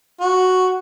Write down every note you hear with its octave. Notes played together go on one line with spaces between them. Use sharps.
F#4